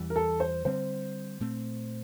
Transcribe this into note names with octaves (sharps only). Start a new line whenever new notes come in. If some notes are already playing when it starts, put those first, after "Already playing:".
Already playing: E2 E3 G3
A#4
A4
C5
D3 G3 C4 C5
A#2 A3 C4